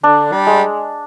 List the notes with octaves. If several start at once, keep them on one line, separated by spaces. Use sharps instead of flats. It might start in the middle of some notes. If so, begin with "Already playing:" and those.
D3 D4
G3
G#3